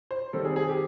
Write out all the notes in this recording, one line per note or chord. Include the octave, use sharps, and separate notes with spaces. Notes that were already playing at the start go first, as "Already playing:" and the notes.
C5
D#3 G3 C4 A4
G#4
G#4
G4